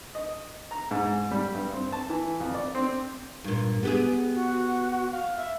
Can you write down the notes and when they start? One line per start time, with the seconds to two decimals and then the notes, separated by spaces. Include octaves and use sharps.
0.15 D#5
0.71 A#5
0.91 G#2
1.31 G3
1.55 G2
1.73 C4
1.92 A5
2.10 E3
2.40 F2
2.55 D5
2.75 C4
3.44 G2 A#2
3.83 B3 G4 G#4
4.35 F#4
5.11 F5
5.37 E5